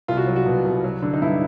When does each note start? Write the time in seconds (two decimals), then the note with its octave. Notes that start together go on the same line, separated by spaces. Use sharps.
0.08 C2 F4
0.17 F#4
0.27 F#3
0.36 F#4
0.46 B2
0.65 C2
0.84 F#3
1.02 D3
1.14 D#4
1.22 G2 E4